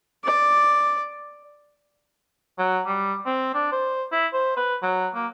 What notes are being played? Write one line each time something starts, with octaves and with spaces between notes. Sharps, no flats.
D5
F#3
G3
C4
D4
C5
E4
C5
B4
F#3
A#3